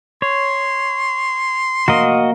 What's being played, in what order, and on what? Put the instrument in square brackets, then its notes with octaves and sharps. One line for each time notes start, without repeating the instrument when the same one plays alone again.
[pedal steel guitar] C#5 [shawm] C6
[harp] A#3 [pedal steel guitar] F#4 D#5